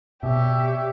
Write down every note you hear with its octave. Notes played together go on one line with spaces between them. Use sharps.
B2 G4 C#5 D5 E5